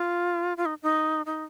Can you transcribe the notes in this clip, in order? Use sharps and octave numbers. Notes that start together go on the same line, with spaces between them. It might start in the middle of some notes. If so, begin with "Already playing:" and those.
Already playing: F4
F4
D#4
D#4
D#4